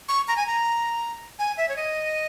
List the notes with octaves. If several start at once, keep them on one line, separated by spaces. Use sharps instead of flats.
C#6
A#5
G#5
A#5
G#5
E5
C#5
D#5